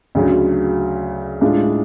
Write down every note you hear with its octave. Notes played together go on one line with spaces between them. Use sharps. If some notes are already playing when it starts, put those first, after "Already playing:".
D2 C#3 F#3
A2 G#3 D4 F4